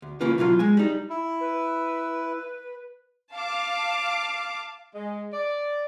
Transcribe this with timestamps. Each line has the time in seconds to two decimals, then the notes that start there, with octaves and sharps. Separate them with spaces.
0.02 D2
0.21 C#3 E3 A#3 C#4 F4 B4
0.38 B2 E3 F#3 F4
0.59 G#3 G#5
0.77 G3 D#4
1.09 E4
1.40 B4
3.33 F5 A5 D6
4.95 G#3
5.33 D5